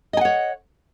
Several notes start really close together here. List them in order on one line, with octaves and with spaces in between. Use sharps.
D#5 G#5 F#5 C#5